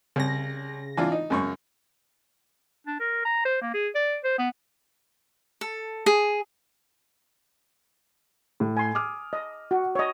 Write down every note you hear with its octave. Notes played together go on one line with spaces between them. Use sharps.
C2 C#3 A#6
E3 D4 F4
D#4
C#2 F#2 C#6
D4
A#4
A#5
C5
A#3
G#4
D5
C5
B3
A4
G#4
A2
G#5 C6
D6 D#6 F6
D#5
F#4
C#5 D#5